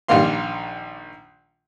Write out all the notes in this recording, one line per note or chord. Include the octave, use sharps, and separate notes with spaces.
A#1 D#3 G3 A#3 F5 C6